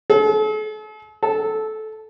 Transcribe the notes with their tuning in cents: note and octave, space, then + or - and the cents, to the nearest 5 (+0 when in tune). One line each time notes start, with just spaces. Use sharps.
A4 -45
A4 -15